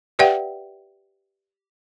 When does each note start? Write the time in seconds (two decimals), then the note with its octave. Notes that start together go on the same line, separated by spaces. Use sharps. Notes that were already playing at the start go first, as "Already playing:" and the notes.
0.19 G4 B4 D5 E5 F#5 G5